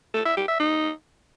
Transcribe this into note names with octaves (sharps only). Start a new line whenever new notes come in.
A4
E5
G4
E5
D#4